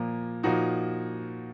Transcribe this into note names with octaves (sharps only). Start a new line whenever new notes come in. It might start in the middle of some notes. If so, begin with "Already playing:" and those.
Already playing: A#2 F3 A#3
A#2 F3 A#3 D#4 F#4